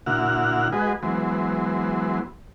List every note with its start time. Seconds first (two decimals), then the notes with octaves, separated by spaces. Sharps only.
0.06 A#2 D3 E4 F#4 F#5 F6
0.72 G#3 F#4 G#4 B4 D#5
1.03 E3 F#3 G#3 B3 C5